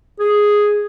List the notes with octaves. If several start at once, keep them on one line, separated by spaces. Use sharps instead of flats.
G#4